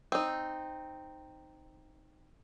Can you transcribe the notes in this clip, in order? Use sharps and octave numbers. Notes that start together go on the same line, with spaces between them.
C4 D#4